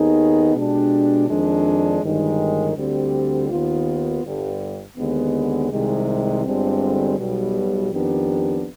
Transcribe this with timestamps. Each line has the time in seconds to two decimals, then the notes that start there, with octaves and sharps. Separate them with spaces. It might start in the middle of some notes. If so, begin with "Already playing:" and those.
Already playing: D#2 D#3 B3 D#4 G#4
0.54 B2 G#3 D4 G4
1.28 F2 D#3 G#3 D4
2.02 G1 G2 D#3 G#3
2.76 D2 D3 G3 C4 G4
3.49 D#2 D#3 B3 F4
4.24 G1 G2 D3
4.98 D#2 D3 G#3 B3
5.72 C2 C3 D#3 G#3
6.45 G1 G2 D3 G#3 C4
7.19 B1 B2 G3
7.92 F2 D#3 B3 D4 G4